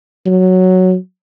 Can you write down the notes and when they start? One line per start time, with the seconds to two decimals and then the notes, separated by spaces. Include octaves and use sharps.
0.26 F#3